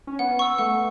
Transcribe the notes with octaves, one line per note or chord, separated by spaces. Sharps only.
C#4
B3 F#5
C#6 E6
A3 F#5